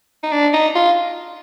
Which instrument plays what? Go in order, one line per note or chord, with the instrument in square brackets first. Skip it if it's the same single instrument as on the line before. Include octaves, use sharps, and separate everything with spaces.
[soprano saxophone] D#4
D4
D#4
F4